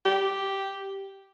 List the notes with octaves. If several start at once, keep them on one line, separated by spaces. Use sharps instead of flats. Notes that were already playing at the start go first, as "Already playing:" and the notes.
G4